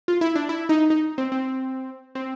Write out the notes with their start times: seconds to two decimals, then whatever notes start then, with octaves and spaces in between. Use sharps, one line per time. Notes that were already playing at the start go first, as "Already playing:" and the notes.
0.08 F4
0.21 E4
0.35 D4
0.49 E4
0.69 D#4
0.90 D#4
1.18 C4
1.32 C4
2.15 C4